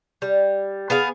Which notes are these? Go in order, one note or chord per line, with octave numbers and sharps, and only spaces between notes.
G3
B3 G#4 F5